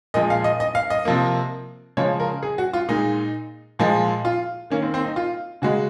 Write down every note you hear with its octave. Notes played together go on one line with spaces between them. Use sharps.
A#2 F3 G#3 D#5
F5
D#5
D#5
F5
D#5
C3 F3 A#3
C#3 F3 G#3 C#5
A#4
G#4
F#4
F4
A#2 G#3 D#4
A#2 F3 G#3
F4
D#3 A#3 C#4
C4
C4
D#4
F4
C#3 G#3 F#4